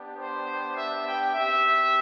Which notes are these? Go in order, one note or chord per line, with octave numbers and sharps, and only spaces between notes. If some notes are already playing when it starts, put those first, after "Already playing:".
Already playing: B3 D4 G4
C5
E5
G5
C4 G4 E5